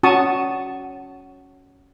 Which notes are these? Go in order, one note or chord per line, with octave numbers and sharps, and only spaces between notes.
C#4 F#4 A5 C#6 D#6